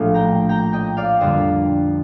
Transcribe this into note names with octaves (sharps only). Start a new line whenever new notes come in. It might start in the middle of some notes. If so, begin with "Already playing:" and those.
Already playing: A#1 A2 F3 A3 F5
G5 A#5
G5 A#5
D#5 G5
D5 F5
F2 D3 G3 A#3 C5 D#5